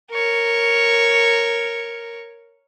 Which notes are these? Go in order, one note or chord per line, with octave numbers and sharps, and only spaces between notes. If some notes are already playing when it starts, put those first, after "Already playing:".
A#4 C#5